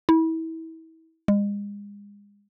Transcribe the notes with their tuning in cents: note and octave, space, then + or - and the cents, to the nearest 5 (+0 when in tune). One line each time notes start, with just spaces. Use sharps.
E4 -30
G#3 -35